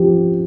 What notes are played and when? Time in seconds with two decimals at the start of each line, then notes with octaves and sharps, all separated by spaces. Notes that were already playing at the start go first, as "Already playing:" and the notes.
Already playing: F3 G4